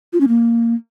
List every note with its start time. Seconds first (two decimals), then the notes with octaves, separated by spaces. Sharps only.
0.13 F4
0.21 C#4
0.28 A#3